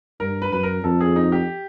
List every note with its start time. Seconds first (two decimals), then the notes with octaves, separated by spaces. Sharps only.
0.20 G2 A#4
0.42 B4
0.52 F#2 B4
0.63 A#4
0.84 F2 A4
1.01 G#4
1.16 D#4
1.32 G4